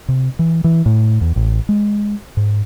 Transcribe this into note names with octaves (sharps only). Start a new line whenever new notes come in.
C3
E3
E3
A2
E2
A1
G#3
G#2